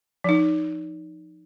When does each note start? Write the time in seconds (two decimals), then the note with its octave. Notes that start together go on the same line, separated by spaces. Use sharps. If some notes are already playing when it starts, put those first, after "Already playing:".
0.24 F3 D#4